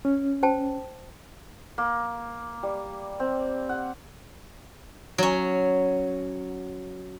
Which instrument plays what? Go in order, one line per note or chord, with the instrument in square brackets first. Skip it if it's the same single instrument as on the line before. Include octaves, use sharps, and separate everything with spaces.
[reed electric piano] C#4
[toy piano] C5 G5 A5
[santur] A#3
G3
C4
F#5
[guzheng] F#3 C#4